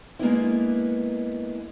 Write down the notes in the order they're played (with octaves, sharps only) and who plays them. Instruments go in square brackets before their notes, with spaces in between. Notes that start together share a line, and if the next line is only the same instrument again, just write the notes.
[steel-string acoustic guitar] G#3 A#3 B3 D4 E4